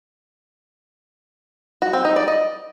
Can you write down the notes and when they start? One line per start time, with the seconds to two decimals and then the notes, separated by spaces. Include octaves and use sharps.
1.82 F#4
1.93 C4
2.05 D#4
2.16 D5
2.28 D#5